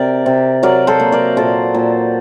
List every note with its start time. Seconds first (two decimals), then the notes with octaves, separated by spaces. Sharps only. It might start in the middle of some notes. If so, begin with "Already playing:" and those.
Already playing: C3 A#4 D5
0.26 C3
0.63 F#3 A#4 D5
0.87 A4 C5
1.00 A#3
1.12 A#4 D5
1.37 A#2 A4 C5
1.74 A#2